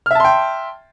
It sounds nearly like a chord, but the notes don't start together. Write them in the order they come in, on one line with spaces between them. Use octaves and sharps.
F6 E5 A5 C6 G5